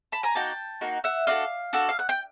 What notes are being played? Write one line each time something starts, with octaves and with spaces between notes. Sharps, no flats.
A5 B5
G#5 A#5
A#3 D#4 F#4 G5 A5
A#3 D#4 F#4
E5 F#5
D4 F#4 A4 D#5 F5
D4 F#4 A4
F5
F#5
G5